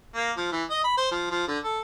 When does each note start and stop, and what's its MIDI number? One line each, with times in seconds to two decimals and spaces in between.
0.15 0.31 58
0.37 0.47 53
0.52 0.64 52
0.70 0.83 75
0.84 0.94 83
0.97 1.09 72
1.11 1.30 53
1.31 1.43 53
1.48 1.58 50
1.64 1.81 69